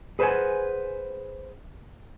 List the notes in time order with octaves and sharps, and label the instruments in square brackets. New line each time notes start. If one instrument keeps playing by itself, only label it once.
[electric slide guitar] G#4 B4 C5 D5 F#5 G#5